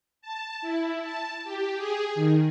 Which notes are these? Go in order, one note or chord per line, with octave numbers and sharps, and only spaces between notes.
A5
E4
A5
G4
G#4
D#3